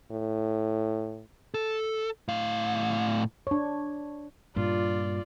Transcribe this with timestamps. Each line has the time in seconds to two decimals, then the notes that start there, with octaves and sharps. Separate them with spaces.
0.11 A2
1.54 A4
2.28 A2 F5
3.47 D4 C#5
4.56 G2 A#2 F4 D5